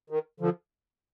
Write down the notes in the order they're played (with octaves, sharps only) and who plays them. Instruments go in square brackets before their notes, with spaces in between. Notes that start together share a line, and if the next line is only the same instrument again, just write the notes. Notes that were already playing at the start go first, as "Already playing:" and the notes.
[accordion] D#3
D3 F3